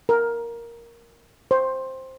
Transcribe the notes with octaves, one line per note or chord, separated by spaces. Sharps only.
A#4
C5